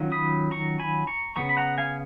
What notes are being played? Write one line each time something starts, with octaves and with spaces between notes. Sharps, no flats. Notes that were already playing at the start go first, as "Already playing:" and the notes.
Already playing: D#3 F#3 C#4 F4
B5 D#6
A#5 C#6
G#5 B5
A#5 C#6
C#3 F3 B3 A#5 C#6
B5
F#5 A#5
F5 G#5